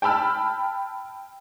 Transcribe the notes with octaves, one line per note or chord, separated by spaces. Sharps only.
G5 A5 B5 E6 F6